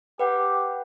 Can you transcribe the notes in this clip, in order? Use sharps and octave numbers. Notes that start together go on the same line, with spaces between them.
G4 B4 F#5 G5